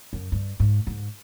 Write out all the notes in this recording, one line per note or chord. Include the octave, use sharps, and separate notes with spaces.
F#2
G2
G#2
G#2